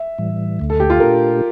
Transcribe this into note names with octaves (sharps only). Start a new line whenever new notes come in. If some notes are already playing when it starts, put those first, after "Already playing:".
Already playing: E5
A2 E3 G3
D2 D3 A3
A4
G4
F4
A#2 A3 D4 G4 A#4